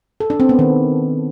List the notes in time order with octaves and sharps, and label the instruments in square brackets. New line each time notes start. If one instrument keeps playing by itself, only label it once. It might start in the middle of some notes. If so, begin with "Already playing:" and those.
[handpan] A4
D4
C4
B3
D#3